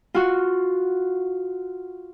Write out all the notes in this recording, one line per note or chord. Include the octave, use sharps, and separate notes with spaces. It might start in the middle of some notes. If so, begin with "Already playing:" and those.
F4 F#4